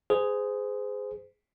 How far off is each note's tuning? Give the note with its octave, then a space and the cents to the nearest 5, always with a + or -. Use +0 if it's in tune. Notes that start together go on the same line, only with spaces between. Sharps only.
G#4 +0 C5 -30